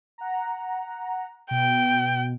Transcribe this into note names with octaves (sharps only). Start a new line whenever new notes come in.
F#5 A#5
B2 G5